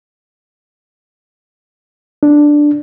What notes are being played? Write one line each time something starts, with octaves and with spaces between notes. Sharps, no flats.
D4